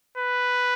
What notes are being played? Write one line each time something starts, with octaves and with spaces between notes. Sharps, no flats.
B4